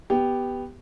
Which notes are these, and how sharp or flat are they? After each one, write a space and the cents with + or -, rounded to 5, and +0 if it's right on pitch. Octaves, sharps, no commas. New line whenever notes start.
B3 +0 G4 +0